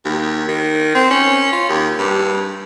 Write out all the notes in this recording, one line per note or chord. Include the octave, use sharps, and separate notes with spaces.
D#2
D#3
C4
C#4
F4
D#2
G2